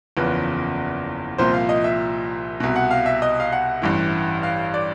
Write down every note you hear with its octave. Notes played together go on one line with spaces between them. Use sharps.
F#1 E2 C#3 F3 B4
C2 A#2 F3 C5
F5
D#5
E5
C2 B2
F#5
F5
E5
D#5
F5
F#5
A1 G2 E3
F5
D5